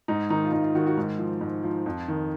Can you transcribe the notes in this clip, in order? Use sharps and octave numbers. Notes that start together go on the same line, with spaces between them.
G#2 D#4
D#3 D#4
F4
G#2 D#4
F4
D#3 F#4
F#4
G#2
F3
G#2
F3
F2
D#3